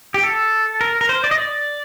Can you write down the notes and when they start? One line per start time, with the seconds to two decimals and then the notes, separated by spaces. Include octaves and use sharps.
0.14 G4
0.23 A4
0.81 A#4
1.01 A#4
1.09 C5
1.24 D5
1.31 D#5
1.38 D5